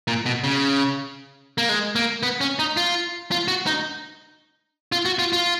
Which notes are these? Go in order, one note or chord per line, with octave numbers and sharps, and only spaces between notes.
A#2
B2
C#3
A#3
G#3
A#3
B3
C#4
D#4
F4
F4
F#4
D#4
F4
F#4
F4
F4